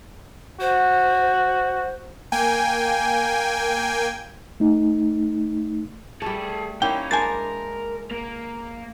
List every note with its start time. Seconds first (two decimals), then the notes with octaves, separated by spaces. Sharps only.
0.61 F#4 C5
2.32 A#3 G5 G#5
4.60 A3 D#4
6.22 G3 A3 G#4 A4
6.82 A#3 C#4 D#4 E4 G5
7.11 G#3 D4 A#4 C5 G#5 A6
8.11 A#3